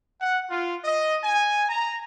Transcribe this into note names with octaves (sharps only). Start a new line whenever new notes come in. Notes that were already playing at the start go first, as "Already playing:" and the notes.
F#5
F4
D#5
G#5
A#5